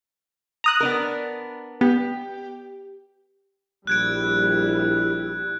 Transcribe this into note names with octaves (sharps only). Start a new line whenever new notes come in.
A#5 D#6 F#6
B3 D4 A#4
B3 G4
A#1 G3 E4 F#6 G#6 D7